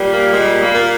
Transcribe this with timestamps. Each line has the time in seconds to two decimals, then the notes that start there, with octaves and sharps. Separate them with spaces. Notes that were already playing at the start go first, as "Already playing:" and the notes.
Already playing: A#2 G3
0.11 A#3
0.33 A#2 G#3
0.61 A#3
0.75 A#2